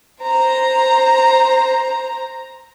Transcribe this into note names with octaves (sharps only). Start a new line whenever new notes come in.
C5 A#5